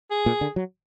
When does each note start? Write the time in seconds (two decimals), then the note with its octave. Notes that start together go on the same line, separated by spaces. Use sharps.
0.11 G#4
0.26 A#2
0.41 D3
0.56 F#3